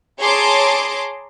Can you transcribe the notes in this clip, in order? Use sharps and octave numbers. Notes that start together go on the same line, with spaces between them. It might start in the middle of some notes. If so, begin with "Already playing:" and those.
G#4 C#5 A5 A#5 C6 D6